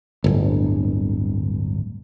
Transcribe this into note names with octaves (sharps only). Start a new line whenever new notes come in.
D1 G1